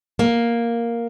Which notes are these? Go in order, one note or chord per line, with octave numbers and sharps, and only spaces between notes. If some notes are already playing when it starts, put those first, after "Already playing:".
A#3